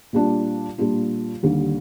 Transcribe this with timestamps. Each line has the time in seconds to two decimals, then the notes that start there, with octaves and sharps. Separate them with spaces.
0.13 A#2 G3 D4 F4
0.78 A#2 G3 D4 F4
1.43 D#2 D3 G3